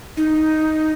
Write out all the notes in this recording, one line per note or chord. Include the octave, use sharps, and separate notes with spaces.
D#4